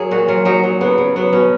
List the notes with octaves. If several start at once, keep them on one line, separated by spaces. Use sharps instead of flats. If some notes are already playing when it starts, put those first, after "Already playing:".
Already playing: F#3 G#4 A#4
A#2 F#4
F#3 F4
F#3 D#4
F#3
C#3 B3
C#3
F#3 B3
B2 C#4